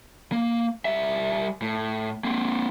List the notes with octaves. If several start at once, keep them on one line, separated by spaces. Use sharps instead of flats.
A#3
G3 E5
A2
A#3 C4